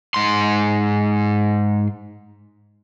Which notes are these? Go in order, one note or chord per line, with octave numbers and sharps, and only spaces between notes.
G#2 C6